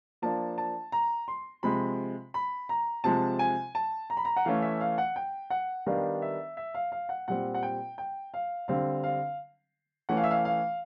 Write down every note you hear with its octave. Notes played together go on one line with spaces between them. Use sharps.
F3 A#3 D4 A5
A5
A#5
C6
C3 F3 G#3 B5
B5
A#5
C3 F3 G#3 A5
G#5
A5
A#5
B5
A#5
F#5
E3 A3 C#4 F5
E5
F5
F#5
G5
F#5
D#3 G3 B3 D4 F5
E5
E5
F5
F5
F#5
A#2 G3 C4 F#5
F#5
G5
G5
F5
D3 G3 C4 F5
F5
E3 A3 C#4 F#5
F5
E5
F5
F5